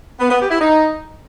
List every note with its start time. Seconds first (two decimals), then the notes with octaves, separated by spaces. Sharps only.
0.20 B3
0.30 B3
0.40 G4
0.51 E4
0.61 D#4